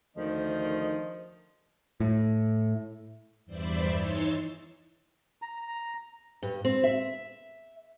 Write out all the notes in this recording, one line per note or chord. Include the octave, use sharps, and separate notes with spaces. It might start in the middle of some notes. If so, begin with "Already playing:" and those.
D2 D#3 F3 D#5
A2
E2 G2 C5 D5 E5 B5
E3 D#4 C#5 C6 E6 A6
A#5
G2
C4
E5